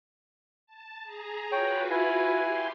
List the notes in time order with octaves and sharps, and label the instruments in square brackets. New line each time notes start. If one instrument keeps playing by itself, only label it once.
[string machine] A5
G#4 A#5
[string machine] F4 F#4 B4 [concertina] C#5 G5
[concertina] E4 G#5
[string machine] G4 C6